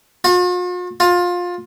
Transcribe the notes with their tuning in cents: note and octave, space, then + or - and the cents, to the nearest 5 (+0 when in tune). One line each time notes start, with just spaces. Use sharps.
F4 +45
F4 +20